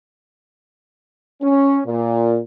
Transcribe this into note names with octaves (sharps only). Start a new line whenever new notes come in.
C#4
A#2